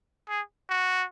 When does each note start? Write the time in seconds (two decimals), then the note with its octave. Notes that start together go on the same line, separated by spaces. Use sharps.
0.29 G#4
0.69 F#4